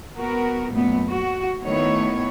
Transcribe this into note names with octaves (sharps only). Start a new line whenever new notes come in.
B3 F#4 A#4
F#2 A#2 A3 B3
F#4
D#3 A3 B3 E4 C#5